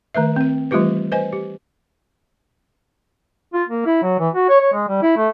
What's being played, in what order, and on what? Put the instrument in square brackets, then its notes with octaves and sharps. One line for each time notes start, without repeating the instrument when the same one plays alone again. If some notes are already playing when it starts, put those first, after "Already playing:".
[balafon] D#3 A3 B4 E5
C4 G5
E3 G3 A3 F4 G4 B4
B4 C5 D#5 G#5
G4
[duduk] F4
A#3
E4
F#3
E3
F#4
C#5
C#5
G#3
G3
E4
A3